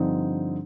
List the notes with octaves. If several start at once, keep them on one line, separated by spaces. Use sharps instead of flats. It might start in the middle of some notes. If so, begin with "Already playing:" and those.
Already playing: G2 D3 F3 C4 D#4